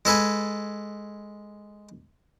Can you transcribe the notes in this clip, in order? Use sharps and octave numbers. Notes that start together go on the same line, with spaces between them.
G#3 A4 B4 G#5